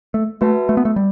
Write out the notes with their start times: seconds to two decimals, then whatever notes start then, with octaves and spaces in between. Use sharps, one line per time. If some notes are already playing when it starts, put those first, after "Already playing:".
0.14 A3
0.41 A3 F#4 B4 E5 A5
0.69 A3
0.77 B3
0.85 A3
0.96 G3